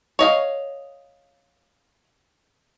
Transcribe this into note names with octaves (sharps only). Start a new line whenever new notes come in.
C#5 D#5 F5